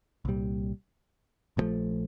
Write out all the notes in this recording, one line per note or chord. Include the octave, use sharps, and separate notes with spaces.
C2 A#2 G3
A#1 A#2 F3 A3